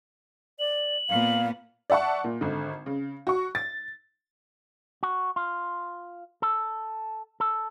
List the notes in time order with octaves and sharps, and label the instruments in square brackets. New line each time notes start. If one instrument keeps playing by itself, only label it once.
[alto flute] D5 [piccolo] F#7
[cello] A#2 B3 [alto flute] F5
[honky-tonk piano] D5 E5 F#5 A5 C#6
A#2
G#1 D3
C#3
F#4 C#6
A6
[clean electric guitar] F#4
F4
A4
A4